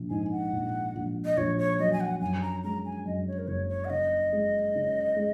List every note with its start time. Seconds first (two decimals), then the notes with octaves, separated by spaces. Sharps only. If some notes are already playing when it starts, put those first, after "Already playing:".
Already playing: A#1
0.10 G#2 G#5
0.31 F#5
0.52 A#1
0.95 A#1
1.25 D#5
1.37 A#1 C#5
1.58 C#5
1.79 F#3 D#5
1.93 G#5
2.00 F#5
2.21 F#2 G#5
2.42 A#5
2.63 G#3 A#5
2.85 G#5
3.06 F#2 D#5
3.28 C#5
3.39 A#4
3.47 F#1 C#5
3.69 C#5
3.85 F#5
3.90 C#3 D#5
4.33 G#3
4.75 C#3
5.16 G#3